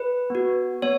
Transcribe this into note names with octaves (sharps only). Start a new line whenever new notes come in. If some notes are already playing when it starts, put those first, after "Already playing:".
Already playing: B4
B3 F#4
B3 C#5